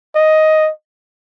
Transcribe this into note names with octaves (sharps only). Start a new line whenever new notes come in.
D#5